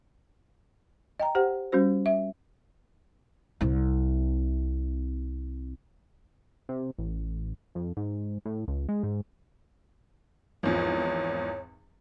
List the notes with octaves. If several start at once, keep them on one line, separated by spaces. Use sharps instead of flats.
D#5 G5 A#5
G4 C5 F#5
G3 C#4 F#4 C5
E5
C2 C3
C3
A1
F2
G#2
A2
C#2
G#3
G#2
G#1 E2 F3 C#5